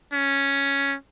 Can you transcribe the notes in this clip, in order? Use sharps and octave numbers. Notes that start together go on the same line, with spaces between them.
C#4